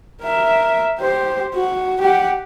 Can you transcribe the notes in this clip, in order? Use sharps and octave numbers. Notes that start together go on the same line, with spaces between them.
A#4 E5
G4 C5
F#4
G4 F#5